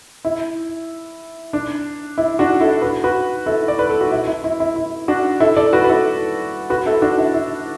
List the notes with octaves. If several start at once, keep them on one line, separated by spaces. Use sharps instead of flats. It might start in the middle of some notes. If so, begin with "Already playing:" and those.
E4
D4
E4
D4 F#4
E4 A4
F#4 B4
F#4 B4
E4 A4
D5
B4
A4
F#4
E4
E4
E4
E4
E4
D4 F#4
E4 A4
A4 D5
F#4 B4
B4
E4 A4
F#4 B4
E4 A4
D4 F#4
E4
E4